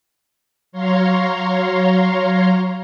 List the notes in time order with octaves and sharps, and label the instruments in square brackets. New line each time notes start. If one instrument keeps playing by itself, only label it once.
[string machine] F#3 C#5 F5 A#5 C6